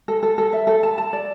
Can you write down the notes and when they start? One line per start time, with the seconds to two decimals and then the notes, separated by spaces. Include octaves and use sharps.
0.08 A4
0.23 A4
0.38 A4
0.53 E5
0.67 A4
0.83 A5
0.98 A5
1.13 D5